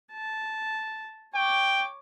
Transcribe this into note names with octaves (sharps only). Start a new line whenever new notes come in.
A5
C#5 G5 D6